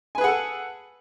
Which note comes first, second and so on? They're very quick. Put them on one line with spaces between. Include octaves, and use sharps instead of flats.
G#5 B4 G#4 F#5 A4